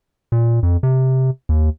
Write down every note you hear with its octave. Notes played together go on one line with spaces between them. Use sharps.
A#2
F2
C3
D#2